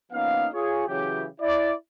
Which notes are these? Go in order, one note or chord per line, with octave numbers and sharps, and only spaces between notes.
F3 A#3 B3 C#4 D#4 F5
F4 G#4 C#5
C#3 E3 F#3 G4
E4 D5